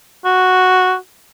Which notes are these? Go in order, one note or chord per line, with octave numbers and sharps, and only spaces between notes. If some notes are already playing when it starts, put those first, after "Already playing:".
F#4